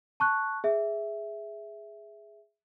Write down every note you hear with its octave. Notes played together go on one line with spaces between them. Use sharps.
A5 C#6 F#6
G#4 E5